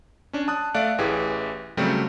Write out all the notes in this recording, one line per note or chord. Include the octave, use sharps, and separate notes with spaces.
C#4 D4
A5 D#6 F#6
A3 D5 E5 F5 F#6 D7
A1 E3 G4 G#4
C#3 F#3 G3 A3 C4